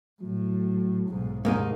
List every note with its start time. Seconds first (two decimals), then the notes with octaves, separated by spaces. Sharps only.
0.22 A2 F#3
1.08 B1 G#2
1.45 D#2 G#2 C3 A#3 D#4